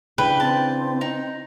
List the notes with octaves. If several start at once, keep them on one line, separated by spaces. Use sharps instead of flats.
C#3 E3 D4 B4 G5
C4 A5
D#4